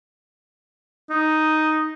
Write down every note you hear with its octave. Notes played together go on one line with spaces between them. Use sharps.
D#4